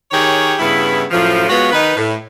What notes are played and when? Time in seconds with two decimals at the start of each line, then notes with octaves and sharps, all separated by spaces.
0.11 D#3 G4 G#4 C#5
0.59 G2 C#3 B3 E4
1.11 F#2 A2 F3
1.49 G#3 B3 F4 F#4 C#5
1.72 D#3 D#4 B4
1.97 A2